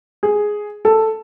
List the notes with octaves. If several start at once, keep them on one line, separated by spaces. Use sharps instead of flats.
G#4
A4